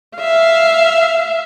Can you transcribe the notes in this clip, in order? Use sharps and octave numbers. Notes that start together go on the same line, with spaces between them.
E5 F5